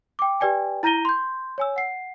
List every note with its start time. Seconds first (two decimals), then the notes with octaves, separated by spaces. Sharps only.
0.19 G5 D6
0.40 G4 B4 D5 G5 G#5
0.83 E4 A#5 G6 A#6 D#7 G7
1.05 C6 G6
1.58 C#5 G#5 E6
1.76 F#5 C7